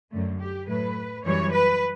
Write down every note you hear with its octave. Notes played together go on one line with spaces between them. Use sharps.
F#2 D3 A3
G4
A2 F#3 A3 B4
F#2 E3 G3 C#5
B4